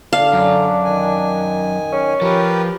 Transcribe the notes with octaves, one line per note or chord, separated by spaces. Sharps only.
D3 D4 F5
F#2
D#3 G#5
C#4
F3 G4 A#4 B4